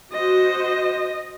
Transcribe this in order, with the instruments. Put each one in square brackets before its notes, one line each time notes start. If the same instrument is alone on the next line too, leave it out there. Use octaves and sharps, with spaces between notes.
[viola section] F#4 C5 [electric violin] D#5